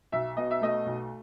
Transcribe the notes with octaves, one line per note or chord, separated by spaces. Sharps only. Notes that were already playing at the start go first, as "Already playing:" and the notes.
B1 E5
B2 D#5
E5
A3 D#5
B1